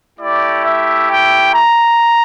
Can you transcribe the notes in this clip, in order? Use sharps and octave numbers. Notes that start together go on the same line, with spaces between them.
A3 E4 G4 D5
E5
G5
A#5